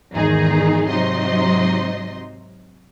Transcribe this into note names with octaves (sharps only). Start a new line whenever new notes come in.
G#1 E2 D#3 D#4 G#4
G#2 C3 F#3 D#4 D#5 C6